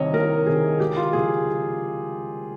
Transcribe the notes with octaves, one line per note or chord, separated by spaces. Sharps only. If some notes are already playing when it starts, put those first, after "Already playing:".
Already playing: C2 C3 D#3 C#5 D#5
C2 A#4
C3 D#3 G#4
C#2 G4
F4
C#3 F3 G#3 G#4